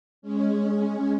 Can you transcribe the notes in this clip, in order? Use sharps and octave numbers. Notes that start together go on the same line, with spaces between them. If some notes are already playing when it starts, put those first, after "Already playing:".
G#3 C#4